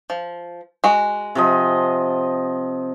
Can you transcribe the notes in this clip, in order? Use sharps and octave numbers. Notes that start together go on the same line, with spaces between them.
F3
G#3 F#4
C3 F3 D#5